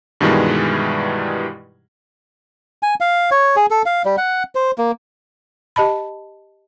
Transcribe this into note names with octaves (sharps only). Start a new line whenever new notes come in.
G2 B2 D#3 E3 G3 G#3
G#5
F5
C#5
G#4
A4
F5
G3
F#5
C5
A#3
G4 D#5 A5 B5